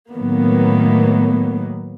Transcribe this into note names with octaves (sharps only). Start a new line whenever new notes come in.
A2 D#3 F#3 A#3 B3